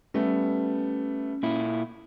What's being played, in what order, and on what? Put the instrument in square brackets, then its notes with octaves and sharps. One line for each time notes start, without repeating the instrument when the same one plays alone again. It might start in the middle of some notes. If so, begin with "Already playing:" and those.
[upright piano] G3 A3 B3 [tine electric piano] C#4
[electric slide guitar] A#2 E4